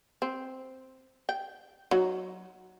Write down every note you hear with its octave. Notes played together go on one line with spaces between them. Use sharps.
C4
G5
F#3 D#4 F#4